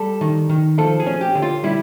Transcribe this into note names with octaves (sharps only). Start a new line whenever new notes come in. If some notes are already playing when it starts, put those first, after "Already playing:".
Already playing: G3 A4
D#3
D#3
F3 A4
G#4
C#4
G4
D3
F4
G3 E4